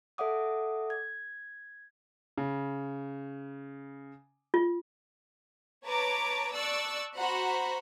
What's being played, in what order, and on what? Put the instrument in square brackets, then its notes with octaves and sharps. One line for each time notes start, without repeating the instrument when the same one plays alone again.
[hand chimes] A4 D5 E5 F#5 D6 D#6
G#6
[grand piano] C#3
[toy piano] F4
[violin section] B4 C#5 A5 A#5 D6
D5 A5 C#6 E6 F#6
F#4 C5 F#5 A#5 B5